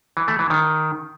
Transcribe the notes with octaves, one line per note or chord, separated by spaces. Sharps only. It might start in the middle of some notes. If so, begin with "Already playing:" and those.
E3
A3
E3
D#3